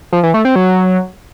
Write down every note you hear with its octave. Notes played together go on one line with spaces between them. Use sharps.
F3
E3
A3
C4
F#3